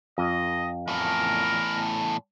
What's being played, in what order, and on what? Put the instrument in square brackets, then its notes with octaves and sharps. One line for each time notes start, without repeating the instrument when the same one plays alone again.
[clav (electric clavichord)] F2 [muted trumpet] D#5
[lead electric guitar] E2 A2 [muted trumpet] A#4